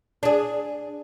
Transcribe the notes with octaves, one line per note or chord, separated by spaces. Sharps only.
D4 G#4